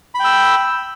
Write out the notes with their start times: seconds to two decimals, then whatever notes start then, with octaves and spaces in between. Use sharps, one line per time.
0.15 B5
0.20 G5
0.24 E6